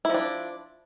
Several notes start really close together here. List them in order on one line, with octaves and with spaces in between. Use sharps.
E4 F3 D4